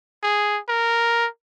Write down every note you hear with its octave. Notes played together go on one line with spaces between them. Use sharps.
G#4
A#4